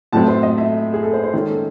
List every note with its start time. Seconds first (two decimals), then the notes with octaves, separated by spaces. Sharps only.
0.12 A2 F#3 A3 C4 A5
0.28 C5
0.43 D#5
0.58 E5
0.94 G#4
1.03 A4
1.13 C5
1.24 C5
1.33 D#3 G#3 C#4 A4
1.48 A4